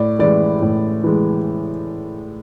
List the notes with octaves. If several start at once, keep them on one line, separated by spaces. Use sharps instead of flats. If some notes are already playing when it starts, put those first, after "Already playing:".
Already playing: A2 D5
E3 G#3 D5
A2
E3 G#3